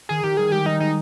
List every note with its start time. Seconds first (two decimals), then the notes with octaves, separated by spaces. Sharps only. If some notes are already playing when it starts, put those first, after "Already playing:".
0.09 D#3 G#4
0.23 D#3 G4
0.37 G3 G#4
0.52 G#3 G4
0.66 G3 D#4
0.80 G#3 D#4